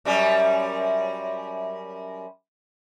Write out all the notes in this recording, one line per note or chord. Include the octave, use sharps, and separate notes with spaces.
F#2 G3 C#4